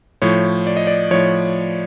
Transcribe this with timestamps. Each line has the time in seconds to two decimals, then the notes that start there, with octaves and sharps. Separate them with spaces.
0.22 A2 F3 C#5
0.67 D5
0.77 D#5
0.87 D5
1.11 A2 F3 C#5